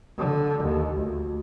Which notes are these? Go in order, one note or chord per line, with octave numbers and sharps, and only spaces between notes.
D3
D#2
D2